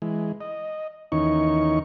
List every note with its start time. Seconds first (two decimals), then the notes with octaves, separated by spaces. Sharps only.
0.02 E3 G#3
0.41 D#5
1.12 D#2 D#3 E3 C#4 D#4 C#6